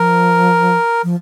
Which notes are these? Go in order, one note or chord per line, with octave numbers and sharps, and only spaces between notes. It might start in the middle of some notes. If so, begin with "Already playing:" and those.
Already playing: F3 A#4
F3